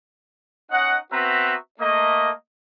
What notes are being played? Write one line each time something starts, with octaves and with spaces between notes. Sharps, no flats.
C#4 D#4 D#5 F#5
B3 C4 F#4 B4 E5 A#5
A3 A#3 D#5